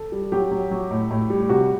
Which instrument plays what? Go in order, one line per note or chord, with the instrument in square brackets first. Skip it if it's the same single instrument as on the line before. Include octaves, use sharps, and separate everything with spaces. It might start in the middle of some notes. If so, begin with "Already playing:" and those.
Already playing: [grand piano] A4
G3
F#3 G4
F#3
F#3
A2
A2
G3
C3 F#4